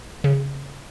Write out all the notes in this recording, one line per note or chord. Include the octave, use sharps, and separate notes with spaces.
C#3